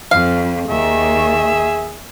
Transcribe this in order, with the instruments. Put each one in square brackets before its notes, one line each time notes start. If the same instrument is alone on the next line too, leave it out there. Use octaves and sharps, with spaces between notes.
[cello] F2 [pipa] F5
[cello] D#2 D#3 [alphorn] G#4 [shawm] E5